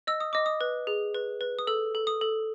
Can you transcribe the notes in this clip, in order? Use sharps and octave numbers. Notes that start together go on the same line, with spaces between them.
D#5 E6
D#6
D#5 D6
D#6
B4
G#4
B4
B4
D#6
A4 E6
A4
D#6
A4